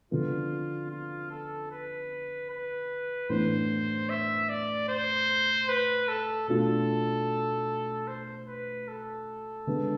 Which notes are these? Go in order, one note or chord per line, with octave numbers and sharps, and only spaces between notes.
D3 F3 B3 F4
F4
A4
B4
B4
A2 E3 B3 D4 C5
E5
D5
C5
B4
A4
B2 A3 D4 F4 A4
C5
B4
A4
D3 G#3 B3 D4